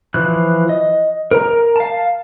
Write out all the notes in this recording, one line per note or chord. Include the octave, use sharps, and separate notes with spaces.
E3 F3 F#6
D#5
A#4 A#5
F5 A5